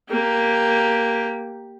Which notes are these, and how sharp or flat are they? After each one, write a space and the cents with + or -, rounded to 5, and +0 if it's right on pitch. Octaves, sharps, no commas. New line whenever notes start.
A#3 +0 G4 +0